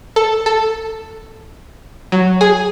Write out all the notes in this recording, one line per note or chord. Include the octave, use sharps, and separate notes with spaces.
A4
A4
F#3
G#4